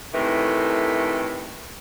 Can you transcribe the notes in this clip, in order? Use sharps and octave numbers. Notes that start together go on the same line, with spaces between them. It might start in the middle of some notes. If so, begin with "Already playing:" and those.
A2 C3 D#3 E3 A3